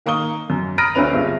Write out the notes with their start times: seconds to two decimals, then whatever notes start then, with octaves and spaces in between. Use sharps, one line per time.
0.06 D#3 A#3 C#6 D#6 G7
0.50 F#2
0.78 A#5 B5 D#6 F6 A#6 D7
0.95 D2 D3 C4 C#4 B4 F7
1.13 G1 G2 G#3 F4 E5